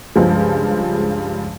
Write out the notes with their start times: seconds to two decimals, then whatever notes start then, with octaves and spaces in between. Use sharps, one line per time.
0.16 C#2 G2 F3 G#3